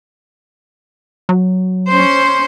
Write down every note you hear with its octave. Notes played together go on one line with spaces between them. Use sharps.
F#3
C#4 C5